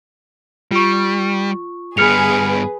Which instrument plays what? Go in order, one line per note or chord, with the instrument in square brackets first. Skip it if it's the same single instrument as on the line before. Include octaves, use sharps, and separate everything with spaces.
[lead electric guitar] G3 [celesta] F4 C#6
[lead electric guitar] G2 B3 [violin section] G#4 B4 [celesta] F6 C#7 F7